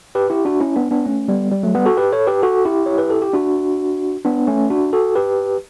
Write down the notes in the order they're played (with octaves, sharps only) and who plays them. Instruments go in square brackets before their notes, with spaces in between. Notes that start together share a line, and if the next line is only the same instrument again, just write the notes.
[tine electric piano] G4 B4
E4 G4
D4 F#4
C#4 E4
B3 D4
B3 D4
A3 C#4
G3 B3
G3
F#3 A3
G3 B3
F#4 A4
G4 B4
A4 C#5
G4 B4
F#4 A4
E4 G4
C#5
B4
A4
G4
D4 F#4
B3 D4
A3 C#4
D4 F#4
F#4 A4
G4 B4